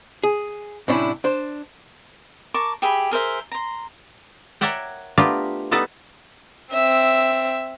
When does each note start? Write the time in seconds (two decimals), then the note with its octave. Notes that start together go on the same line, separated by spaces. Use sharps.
0.24 G#4
0.88 A2 C3 G3 C#4 D4 E4
1.24 D4 C5
2.54 A#4 A5 C#6 D6
2.82 G4 G#4 E5 B5
3.11 G#4 A#4 C5 E5
3.52 A#5 C6
4.61 A#4 C#5 D5 E5 F#5 G5
5.18 A3 B3 D4 F4 G4 A#4
5.71 G3 B3 D#4 A4 B4 F#5
6.73 C4 E5